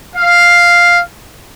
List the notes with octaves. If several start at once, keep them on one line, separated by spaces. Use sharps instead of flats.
F5